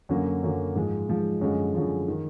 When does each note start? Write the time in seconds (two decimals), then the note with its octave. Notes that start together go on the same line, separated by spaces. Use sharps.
0.09 F#2 D3 F#3 A#3
0.43 F#2 D3 F#3 A#3
0.75 G#2 F3 G#3
1.09 G#2 F3 G#3
1.41 F#2 D3 F3 G#3
1.75 F#2 D3 F3 G#3
2.08 D#3